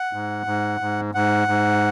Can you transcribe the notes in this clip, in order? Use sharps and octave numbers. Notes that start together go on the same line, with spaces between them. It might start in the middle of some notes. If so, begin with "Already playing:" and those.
Already playing: F#5
G#2
G#2
G#2
G#2 F#5
G#2